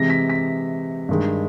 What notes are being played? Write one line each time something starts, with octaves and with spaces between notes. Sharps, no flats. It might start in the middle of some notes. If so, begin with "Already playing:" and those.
Already playing: C3 E3 G#3 A#6
B6
B6
G2 D#3 G#3